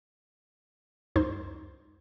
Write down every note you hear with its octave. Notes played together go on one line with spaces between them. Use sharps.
C#2 F#2 D#4 C5 C6